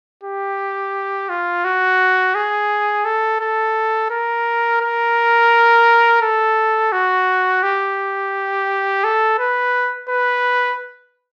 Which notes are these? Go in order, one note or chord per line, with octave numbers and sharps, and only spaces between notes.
G4
F4
F#4
G#4
A4
A4
A#4
A#4
A4
F#4
G4
A4
B4
B4